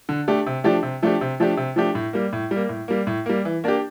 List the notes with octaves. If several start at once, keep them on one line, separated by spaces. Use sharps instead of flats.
D3
A3 D4 G4
C3
F3 A3 D4 G4
C3
F3 A3 D4 G4
C3
F3 A3 D4 G4
C3
F3 A3 D4 G4
A2
G3 A#3
A2
G3
A#3
A2
G3 A#3
A2
G3 A#3
E3
A#3 D4 G4